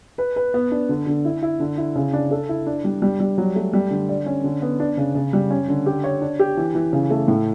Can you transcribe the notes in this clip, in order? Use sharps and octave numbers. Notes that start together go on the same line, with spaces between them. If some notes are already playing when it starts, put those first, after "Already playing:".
B4
B4
B3
D4
D3
D3
E4
E4
D3
E4
C#3
D4
A4
E4
D4
G3
G3
G3
F#3
A3
G3
D3
D5
C#4
D3
B3
D4
C#3
C#3
G3
C#4
D3
G4
C#5
D4
G4
E3
E3
C#3
A3
A2